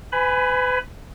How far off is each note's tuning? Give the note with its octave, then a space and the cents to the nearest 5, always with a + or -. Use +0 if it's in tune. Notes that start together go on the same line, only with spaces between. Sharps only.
B4 +35 G#5 +0 B5 +0